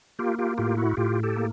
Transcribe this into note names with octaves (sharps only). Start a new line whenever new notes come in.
A#3 F4 G4
F4 G4
A2 F4 G4
E4 F#4
A2 F4 G4
G4 A4
A#3